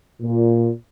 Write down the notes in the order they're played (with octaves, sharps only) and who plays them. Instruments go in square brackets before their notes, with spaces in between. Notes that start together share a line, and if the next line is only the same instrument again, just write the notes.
[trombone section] A#2